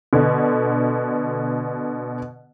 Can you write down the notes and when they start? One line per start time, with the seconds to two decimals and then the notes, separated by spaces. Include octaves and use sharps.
0.13 B2 D3